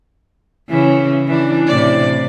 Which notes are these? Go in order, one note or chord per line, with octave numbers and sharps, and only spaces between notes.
C#3 E3
E3 D4
A2 C3 D5